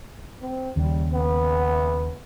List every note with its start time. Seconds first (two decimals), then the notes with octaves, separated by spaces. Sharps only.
0.41 C4
0.76 D#2 C#3 G3
1.13 B3